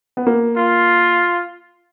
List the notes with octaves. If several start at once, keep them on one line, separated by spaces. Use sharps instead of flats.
B3
A#3
F4